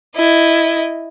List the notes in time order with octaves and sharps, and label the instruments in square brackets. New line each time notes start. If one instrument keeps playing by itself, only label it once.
[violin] E4 D#5